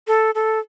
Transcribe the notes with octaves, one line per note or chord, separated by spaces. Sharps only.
A4
A4